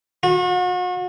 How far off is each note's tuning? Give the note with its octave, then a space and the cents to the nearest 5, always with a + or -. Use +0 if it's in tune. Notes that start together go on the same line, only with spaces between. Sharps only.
F#4 -40